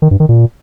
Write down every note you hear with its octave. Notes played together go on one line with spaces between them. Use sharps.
D#3
G2
D#3
A#2